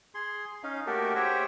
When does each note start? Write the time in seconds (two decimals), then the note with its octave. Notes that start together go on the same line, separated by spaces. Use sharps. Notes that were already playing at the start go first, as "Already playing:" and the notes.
0.14 G#4 C6
0.63 C#4 D#4 F5
0.87 A3 A#3 F#4 G4 A4 A#4
1.15 G4 G#4 C5 C#5 E5 G5